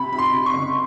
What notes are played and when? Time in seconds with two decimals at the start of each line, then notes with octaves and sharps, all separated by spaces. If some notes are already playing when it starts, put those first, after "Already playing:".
Already playing: C3 B5
0.12 C3 B5
0.19 C6
0.33 C3
0.46 C#6
0.53 F#1